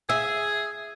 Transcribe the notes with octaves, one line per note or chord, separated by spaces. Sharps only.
G#4 E5